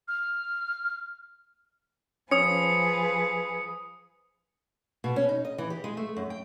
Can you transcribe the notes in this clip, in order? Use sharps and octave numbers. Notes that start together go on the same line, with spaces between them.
F6
F3 C#4 G#4 B4 D#6 C#7
B2
C#4
D#4
D#5
E3
G4
G#3
A3
F#2
G5